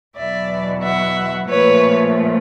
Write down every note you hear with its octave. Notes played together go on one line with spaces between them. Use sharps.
E2 B2 F#3 D5 E5
E5 F#5
A#2 F3 A3 B4 C#5